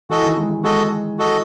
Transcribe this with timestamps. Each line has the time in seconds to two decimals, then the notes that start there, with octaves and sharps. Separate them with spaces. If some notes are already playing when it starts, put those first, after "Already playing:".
0.09 E3 F#4 A4 D#5
0.23 D#3
0.37 G#3
0.50 G#3
0.63 G#3 F#4 A4 D#5
1.19 F#4 A4 D#5